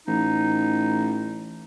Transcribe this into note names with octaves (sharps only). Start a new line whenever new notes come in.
A1 D#4